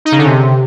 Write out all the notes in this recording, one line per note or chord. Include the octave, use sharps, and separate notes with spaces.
D#4
C#3
D3
C3